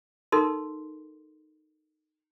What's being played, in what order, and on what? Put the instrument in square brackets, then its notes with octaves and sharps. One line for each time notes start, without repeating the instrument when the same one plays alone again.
[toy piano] D#4 A4 A#4 C6